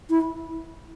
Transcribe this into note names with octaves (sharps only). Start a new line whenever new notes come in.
E4